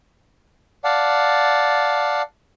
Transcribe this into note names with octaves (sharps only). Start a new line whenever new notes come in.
D5 F5 F#5 A5